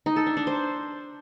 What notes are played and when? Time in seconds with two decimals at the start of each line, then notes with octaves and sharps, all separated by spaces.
0.06 D#4
0.16 A4
0.26 D4
0.37 D4
0.47 C5